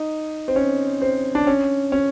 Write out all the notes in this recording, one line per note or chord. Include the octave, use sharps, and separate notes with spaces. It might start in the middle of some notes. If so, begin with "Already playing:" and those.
Already playing: D#4
C4
C#4
C4
D4
C#4
C#4